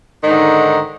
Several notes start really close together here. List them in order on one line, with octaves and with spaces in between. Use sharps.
D#3 G#2 D3